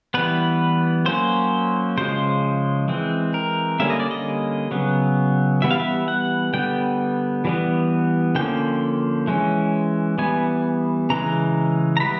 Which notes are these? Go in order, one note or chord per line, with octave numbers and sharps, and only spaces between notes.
E3 G3 B3 B4
F#3 A#3 C#4 C5
C#3 F3 G#3 C5
E3 G#3 C4
A#4
D3 G3 A#3 C#4 E5
D#5
D5
D#5
C#3 F#3 B3
E3 G3 B3 E5
F5
E5
F#5
D3 G3 B3 G5
E3 G3 B3
D3 F3 A#3 C#4 G5
E3 G#3 C#4
E3 G3 B3 G#5
C#3 E3 G#3 A#5
A#5
E3 G3 B3 B5